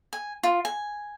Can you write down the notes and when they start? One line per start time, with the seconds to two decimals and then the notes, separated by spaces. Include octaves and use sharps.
0.13 G#5
0.43 F4
0.65 G#5